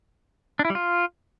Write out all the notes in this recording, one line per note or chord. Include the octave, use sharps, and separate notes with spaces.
D4
E4
G3
F4